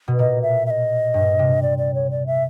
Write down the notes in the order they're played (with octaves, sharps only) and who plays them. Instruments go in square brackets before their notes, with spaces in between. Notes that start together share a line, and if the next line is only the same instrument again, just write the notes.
[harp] B2
[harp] A#2 [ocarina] D#5
[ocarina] E5
E5
D#5
[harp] G2
C3
[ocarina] D5
D5
C#5
D5
E5